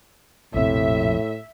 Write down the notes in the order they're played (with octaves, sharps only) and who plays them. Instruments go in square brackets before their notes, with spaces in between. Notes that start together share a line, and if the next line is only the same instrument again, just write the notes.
[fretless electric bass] A#1 F2 C3 [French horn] A2 [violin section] E5